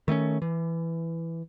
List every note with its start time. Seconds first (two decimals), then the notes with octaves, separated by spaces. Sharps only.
0.08 D#3 A3 C4 C#4
0.42 E3